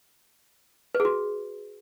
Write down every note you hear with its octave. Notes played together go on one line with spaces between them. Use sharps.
B4
G#4
F#4